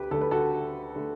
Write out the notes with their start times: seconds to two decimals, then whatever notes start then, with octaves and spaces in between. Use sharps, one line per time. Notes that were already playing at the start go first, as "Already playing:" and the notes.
Already playing: D2 D3 G4 B4
0.11 D2 D3 A3 A4
0.21 B4
0.31 F#4 A4
0.95 D3 A3